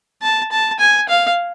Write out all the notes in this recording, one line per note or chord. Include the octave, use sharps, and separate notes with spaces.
A5
A5
G#5
F5